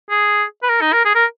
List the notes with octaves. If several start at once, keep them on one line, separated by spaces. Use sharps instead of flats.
G#4
B4
A#4
D#4
A#4
G#4
A#4